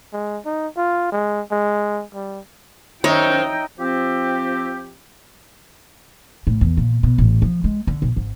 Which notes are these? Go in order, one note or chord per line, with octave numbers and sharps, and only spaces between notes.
G#3
D#4
F4
G#3
G#3
G3
F#2 D#3 C4 D#4 C#5 D#5 E5 G5
F3 C4 G4
A2
E2
A#2
B2
A1
F3
G#3
D3
B1
G#1